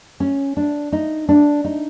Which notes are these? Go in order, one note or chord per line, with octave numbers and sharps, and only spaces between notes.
C#4
D4
D#4
D4
D#4